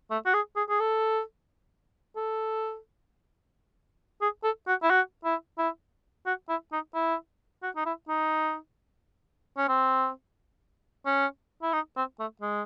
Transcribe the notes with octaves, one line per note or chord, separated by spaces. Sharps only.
A3
F#4
G#4
G#4
G#4
A4
A4
G#4
A4
F#4
E4
F#4
E4
E4
F#4
E4
D#4
E4
F#4
D#4
E4
D#4
C#4
C4
C#4
E4
D#4
C4
A3
G#3